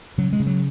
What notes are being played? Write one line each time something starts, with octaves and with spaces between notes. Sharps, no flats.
C#3 F#3
G#3
C#3
F#3